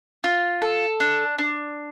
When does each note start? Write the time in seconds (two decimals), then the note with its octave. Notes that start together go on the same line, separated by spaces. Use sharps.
0.24 F4
0.62 A4
1.00 D4
1.38 D4